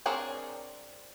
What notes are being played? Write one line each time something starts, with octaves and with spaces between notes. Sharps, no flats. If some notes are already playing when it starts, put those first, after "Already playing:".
C4 D4 G#4 A#4 C#5